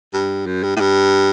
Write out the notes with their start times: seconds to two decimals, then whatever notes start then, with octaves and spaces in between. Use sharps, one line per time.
0.13 G2
0.47 F#2
0.63 G2
0.76 A2
0.81 G2